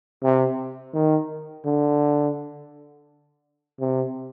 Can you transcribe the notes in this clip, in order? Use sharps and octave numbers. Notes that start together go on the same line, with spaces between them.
C3
D#3
D3
C3